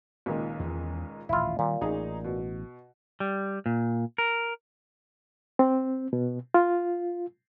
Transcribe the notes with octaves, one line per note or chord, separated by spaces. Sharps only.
C#2 A#2 D#3
E2
D#1 A1 E4 F4
A#2 D#3 G3
A1 D#4 G#4
B2
G3
A#2
A#4
C4
B2
F4